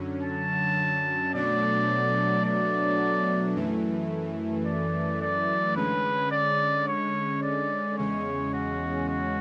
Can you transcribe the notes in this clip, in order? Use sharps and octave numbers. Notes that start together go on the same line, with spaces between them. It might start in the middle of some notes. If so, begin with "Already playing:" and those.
Already playing: F#2 D3 F#3 C#4
A5
B2 F#3 A3 D4 D5
D5
F#2 E3 A3
D5
D5
D3 G#3 C#4 B4
D5
C#5
D5
E2 C#3 G#3 C#4 C#5
F#4
F#4